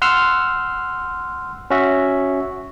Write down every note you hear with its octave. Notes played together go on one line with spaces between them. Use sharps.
F#5 C6 E6 F6
C#4 F#4 E5